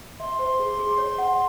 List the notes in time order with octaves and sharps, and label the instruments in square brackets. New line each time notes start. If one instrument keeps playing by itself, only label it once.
[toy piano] E5 [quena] C6
[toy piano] C5
G#4
G#4
C#5
F#5